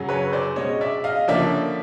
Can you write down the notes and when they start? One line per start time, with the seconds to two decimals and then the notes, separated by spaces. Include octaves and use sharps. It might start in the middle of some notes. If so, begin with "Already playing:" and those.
Already playing: F#2 C#3 F#3
0.09 B4 C#5
0.32 C5 D5
0.56 B2 G#3 C#4 C#5 D#5
0.81 D5 E5
1.04 D#5 F5
1.28 D3 F3 A#3 C#4 D5 E5